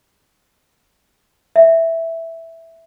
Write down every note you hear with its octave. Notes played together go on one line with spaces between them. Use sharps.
E5